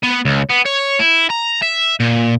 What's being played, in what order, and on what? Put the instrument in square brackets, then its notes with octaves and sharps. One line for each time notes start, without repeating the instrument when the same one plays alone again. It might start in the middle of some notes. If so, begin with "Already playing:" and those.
[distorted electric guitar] B3
C#2
B3
C#5
E4
A#5
E5
A#2